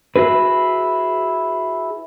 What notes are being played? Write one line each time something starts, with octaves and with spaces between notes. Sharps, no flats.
E4 F#4 G#4 B4